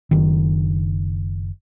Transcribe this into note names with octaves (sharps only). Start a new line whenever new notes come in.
F#1 D#3